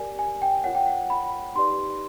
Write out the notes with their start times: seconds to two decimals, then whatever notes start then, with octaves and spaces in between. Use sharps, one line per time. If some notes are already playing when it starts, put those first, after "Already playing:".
Already playing: G4 A#4 D5 G#5
0.19 G#5
0.42 G5
0.64 F4 A#4 C#5 F#5
0.75 G5
0.87 F#5
1.10 B5
1.55 D#4 G4 B4 D5 C6